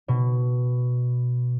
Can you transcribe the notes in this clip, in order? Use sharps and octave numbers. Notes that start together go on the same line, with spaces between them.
B2